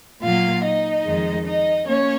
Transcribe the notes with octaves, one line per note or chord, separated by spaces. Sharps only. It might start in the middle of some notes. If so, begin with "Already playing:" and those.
A#2 F#3 A#3 F4 F5
D#4 D#5
F2 D#3 G#3
D#4 D#5
A#3 C#4 C#5